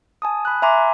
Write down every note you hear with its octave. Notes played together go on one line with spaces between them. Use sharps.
G#5 A5 D#6
B5 F#6
E5 G#5 A#5 C6 D6